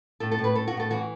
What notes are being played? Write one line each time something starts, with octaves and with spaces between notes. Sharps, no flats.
A2 A4
A4
A2
B4
A2 A4
F#4
A2
A4
E3 F#4